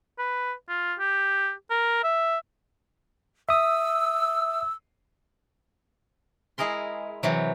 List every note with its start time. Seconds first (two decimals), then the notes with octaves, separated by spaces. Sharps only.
0.19 B4
0.69 F4
1.00 G4
1.71 A#4
2.04 E5
3.49 E5 D#6 E6
6.58 G#3 E4 G#4 A#4 C6
7.23 C3 E3 F#3